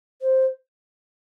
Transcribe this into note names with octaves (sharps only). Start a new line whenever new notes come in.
C5